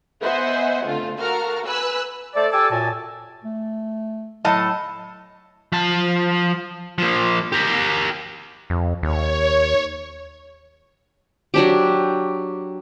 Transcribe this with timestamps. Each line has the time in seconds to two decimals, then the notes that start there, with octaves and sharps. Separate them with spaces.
0.23 B3 C5 D#5 E5 F#5 G#5
0.84 D3 A3 C4 F4
1.19 F#4 A4 A#4 F5 A#5 F6
1.66 B4 G#5 E6 F#6
2.36 A3 A4 C5 D5
2.52 G4 A4 G#5 A5 D6 E6
2.71 F#2 A#2 F#4 G#5 A5
3.44 A3
4.45 A2 F#3 D#5 A5
5.72 F3 A5
6.98 F3 A#3
7.52 G4 A#4
8.70 F2
9.03 D#2 C#5
11.54 F#3 D4 G4